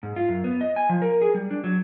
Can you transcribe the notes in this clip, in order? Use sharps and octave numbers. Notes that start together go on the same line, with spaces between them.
G#2
F4
F#2
B3
D#5
G#5
F3
A#4
G#4
G3
D4
F#3